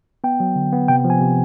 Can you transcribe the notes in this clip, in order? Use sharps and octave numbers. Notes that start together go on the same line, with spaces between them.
B3 G5
F#3
D3
B3
C3 G5
F3
G#5
C3